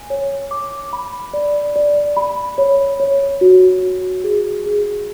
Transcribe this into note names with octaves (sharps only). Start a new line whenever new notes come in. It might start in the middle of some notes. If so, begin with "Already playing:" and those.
Already playing: G#5
C#5
D6
B5
D5
D5
B5
C#5
C#5
F#4
F#4
G#4
G#4